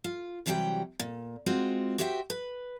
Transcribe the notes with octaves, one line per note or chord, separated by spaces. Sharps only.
F4
C3 E3 F#3 G3 C#5 G5
A#2
G#3 C4 F4 F#4
F#4 G4 C5 E5 F#5 G5
B4